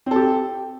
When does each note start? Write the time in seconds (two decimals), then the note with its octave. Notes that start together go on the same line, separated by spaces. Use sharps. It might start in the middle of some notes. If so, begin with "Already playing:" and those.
0.06 C4
0.11 A4
0.16 G4